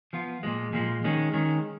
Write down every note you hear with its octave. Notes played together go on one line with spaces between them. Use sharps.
F3 B3 F4
A#2 F3 G#3
A#2 F3 G#3
D#3 G#3 C#4
D#3 G#3 C#4